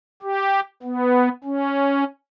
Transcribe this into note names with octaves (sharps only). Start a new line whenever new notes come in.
G4
B3
C#4